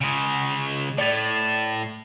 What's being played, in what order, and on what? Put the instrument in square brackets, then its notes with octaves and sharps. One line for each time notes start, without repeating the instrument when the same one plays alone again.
[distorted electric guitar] C#3 G#3
[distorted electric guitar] A2 [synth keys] D5 A6